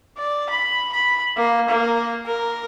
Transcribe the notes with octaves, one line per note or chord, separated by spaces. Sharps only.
D5
B5
B5
A#3
A#3
A#4